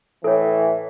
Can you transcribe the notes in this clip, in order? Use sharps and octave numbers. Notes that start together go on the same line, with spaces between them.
A2 E3 A4 C#5